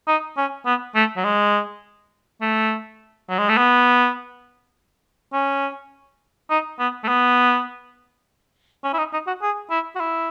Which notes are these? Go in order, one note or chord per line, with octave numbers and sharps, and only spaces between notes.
D#4
C#4
B3
A3
F#3
G#3
A3
F#3
G#3
A3
B3
C#4
D#4
B3
A3
B3
C#4
E4
D#4
D#4
F#4
G#4
E4
F#4
E4